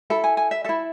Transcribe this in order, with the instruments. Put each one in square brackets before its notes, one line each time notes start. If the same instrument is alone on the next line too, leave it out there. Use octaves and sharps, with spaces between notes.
[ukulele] E4 A4 A5
G#5
G#5
E5
E4 A4 E5